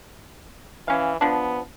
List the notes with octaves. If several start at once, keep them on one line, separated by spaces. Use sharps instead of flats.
E3 C#4 F5
F3 B3 D4